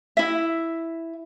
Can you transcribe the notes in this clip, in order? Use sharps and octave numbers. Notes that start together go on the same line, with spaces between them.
E4 E5